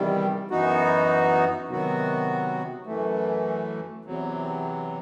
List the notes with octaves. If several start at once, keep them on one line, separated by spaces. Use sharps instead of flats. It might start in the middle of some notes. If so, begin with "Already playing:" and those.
Already playing: E2 C3 D#3 G3
F#2 E3 B3 D#4 F#4
C3 D#3 F#3 B3 F#4
F#2 E3 A3
E2 C3 F#3